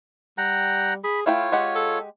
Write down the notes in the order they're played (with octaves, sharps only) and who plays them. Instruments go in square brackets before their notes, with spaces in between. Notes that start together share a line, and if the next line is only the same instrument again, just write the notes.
[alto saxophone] G3 [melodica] F#5 G5 A#5
[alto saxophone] G#4 [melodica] B5
[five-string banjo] A3 E4 G5 [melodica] F4 C#5 [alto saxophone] F5
[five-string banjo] G#3 G4 F#5
[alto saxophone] A4